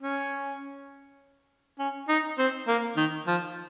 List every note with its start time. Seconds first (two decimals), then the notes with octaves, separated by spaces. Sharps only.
0.02 C#4
1.79 C#4
2.09 D#4
2.38 C4
2.68 A#3
2.97 D#3
3.27 F3